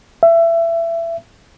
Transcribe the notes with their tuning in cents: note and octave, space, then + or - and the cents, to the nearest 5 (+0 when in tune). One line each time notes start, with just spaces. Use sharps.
E5 +25